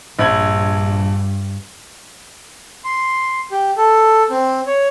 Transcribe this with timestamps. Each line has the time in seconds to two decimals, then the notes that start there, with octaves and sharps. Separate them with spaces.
0.19 A#1 G2 B5 G#6
2.85 C6
3.51 G4
3.77 A4
4.30 C4
4.67 C#5